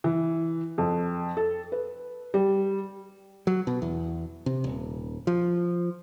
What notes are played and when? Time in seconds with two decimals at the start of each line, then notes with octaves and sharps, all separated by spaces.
0.04 E3
0.78 F2
1.37 A4
1.72 B4
2.34 G3
3.47 F#3
3.67 B2
3.82 E2
4.46 C3
4.64 D#1
5.27 F3